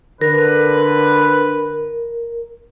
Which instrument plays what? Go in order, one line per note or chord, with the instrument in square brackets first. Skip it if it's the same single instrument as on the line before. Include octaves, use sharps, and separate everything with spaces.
[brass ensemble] D3 B4 [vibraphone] A#4